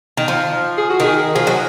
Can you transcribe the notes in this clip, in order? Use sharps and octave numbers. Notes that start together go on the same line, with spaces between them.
D#3
F3
G#4
F#4
D#3 G#4
F3 G#4
F#3